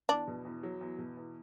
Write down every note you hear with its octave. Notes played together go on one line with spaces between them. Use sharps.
E2 D4
B2
E2
F#3
E2
B2
E2